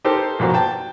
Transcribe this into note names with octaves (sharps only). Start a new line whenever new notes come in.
D#4 G4 A4 A#4 C5
A#1 B2 A#3 C5
G5 A5